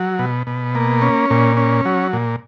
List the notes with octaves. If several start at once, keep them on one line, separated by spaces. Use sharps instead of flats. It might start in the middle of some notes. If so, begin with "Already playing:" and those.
Already playing: F#3
B2
B2
A#3
C#4
A#2
C#4
F#3
A#2